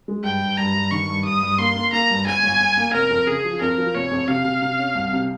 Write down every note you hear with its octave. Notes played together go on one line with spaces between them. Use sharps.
G#3
G2 G5
G2
G2 A#5
G2
D#3 C#6
G2
G2 D#6
G2
A#3 C6
A#3
A#3 A#5
G2
G1 G#5
G1
G1
A#3
F1 A#4
F2
C#3 G#4
F3
F2 A#4
F3
F1 C#5
F2
C3 F5
C3
C3
C#4
C2
C3